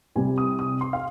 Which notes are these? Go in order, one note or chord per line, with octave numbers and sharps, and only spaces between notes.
C2 C3 G3 G#5
D#6
D#6
C6
F5